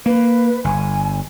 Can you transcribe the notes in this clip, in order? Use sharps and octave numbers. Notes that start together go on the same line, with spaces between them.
A#3 B4
G1 G#5